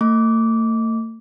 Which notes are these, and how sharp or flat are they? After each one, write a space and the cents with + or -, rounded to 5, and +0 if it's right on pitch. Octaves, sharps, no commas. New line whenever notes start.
A3 +40 D6 -15